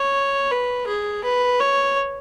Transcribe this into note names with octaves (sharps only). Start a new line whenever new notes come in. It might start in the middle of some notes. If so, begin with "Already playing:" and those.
Already playing: C#5
B4
G#4
B4
C#5